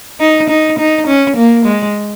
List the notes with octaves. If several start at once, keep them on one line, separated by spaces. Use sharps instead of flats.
D#4
D#4
D#4
C#4
A#3
G#3